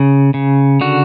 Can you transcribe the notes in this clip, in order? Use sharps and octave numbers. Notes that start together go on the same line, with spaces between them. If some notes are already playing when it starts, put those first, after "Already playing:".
Already playing: C#3
C#3
D3 F#4